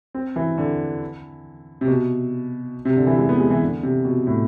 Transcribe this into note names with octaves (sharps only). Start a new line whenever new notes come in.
C4
E3
D3
C3
B2
C3
D3
E3
G#3
B3
G#3
E3
D3
C3
B2
A2